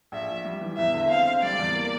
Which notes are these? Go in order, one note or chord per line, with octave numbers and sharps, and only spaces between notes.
A#1 E5
F3
G3
E3
E2 E5
D3
C4 F5
C4
G3 D5
E2
A#3